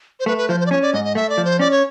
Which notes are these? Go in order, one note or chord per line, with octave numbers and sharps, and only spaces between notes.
C5
A3 B4
B4
F3 C5
C5
D5
C#4 C#5
D5
G#2 D#5
D#5
A3 E5
D5
F3
C5
C#4 D5
C#5